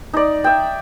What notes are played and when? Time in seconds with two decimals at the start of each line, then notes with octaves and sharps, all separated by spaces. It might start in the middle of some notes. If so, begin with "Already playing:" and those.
0.13 D#4 D5
0.44 E5 G5